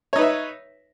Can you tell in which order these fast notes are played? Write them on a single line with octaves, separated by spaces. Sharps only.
C#5 D#4 B4 E5